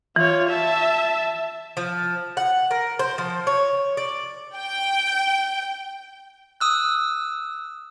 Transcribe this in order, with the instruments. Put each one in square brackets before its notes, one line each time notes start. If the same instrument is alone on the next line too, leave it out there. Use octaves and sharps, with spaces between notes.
[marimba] E3 [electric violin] F4 C#5
[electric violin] E5 A5
[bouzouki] F3
F#5
A#4
C5
F3
C#5
D5
[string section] G5
[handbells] D#6 E6 F#6